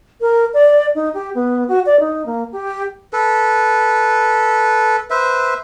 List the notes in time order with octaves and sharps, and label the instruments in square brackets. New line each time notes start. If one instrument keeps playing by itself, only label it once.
[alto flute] A#4
D5
D#4
G4
B3
F#4
D5
D#4
A#3
G4
[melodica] A4 B4
B4 C5 E5